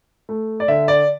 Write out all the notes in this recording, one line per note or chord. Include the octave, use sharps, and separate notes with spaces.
A3
D5
D3 E5
D5